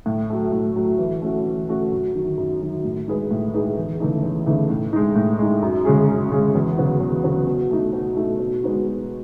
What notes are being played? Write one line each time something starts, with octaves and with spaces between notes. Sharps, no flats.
A2
F#3 A3
A2
F#3 A3
E3
A3 C#4 F#4
E3
A3 C#4 F#4
F#2
D#3 F#3
F#2
D#3 F#3
A2
G#3 D#4 G#4 B4
A2
G#3 D#4 G#4 B4
E2
C#3 E3 A3 D#4
E2
C#3 E3 A3 D#4
A2
G#3 D#4
A2
G#3 D#4
F#2
C#3 G#3 C#4 G#4
F#2
C#3 G#3 C#4 G#4
E2
C#3 F#3 B3 F#4
E2
C#3 F#3 B3 F#4
B2
A3 D#4
B2
A3 D#4
B2
G#3 B3 D#4 F#4
B2